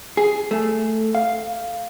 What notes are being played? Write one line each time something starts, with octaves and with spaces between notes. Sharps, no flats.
G#4
A3
F5